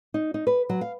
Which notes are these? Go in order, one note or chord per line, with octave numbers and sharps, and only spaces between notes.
D#4
D#4
B4
F#3
F5